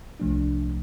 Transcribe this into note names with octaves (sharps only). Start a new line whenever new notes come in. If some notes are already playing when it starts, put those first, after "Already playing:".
C2 C3 F3 A3 D4